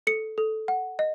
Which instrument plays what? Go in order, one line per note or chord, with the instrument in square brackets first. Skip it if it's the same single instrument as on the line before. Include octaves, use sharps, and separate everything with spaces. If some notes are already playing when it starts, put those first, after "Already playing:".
[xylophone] A4 C#7
A4
F#5
D#5